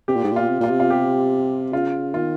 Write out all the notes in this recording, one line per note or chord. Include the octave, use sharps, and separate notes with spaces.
C3 G4
A#2
G#2
A#2
F4
C3
A#2 F4
C3
F4
G4
C#3 F4
D#3 F4